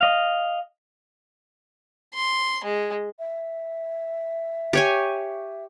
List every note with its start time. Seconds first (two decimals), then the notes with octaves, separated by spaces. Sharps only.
0.01 D#5 F5
2.15 C6
2.64 G#3
3.19 E5
4.73 G4 C#5 G#5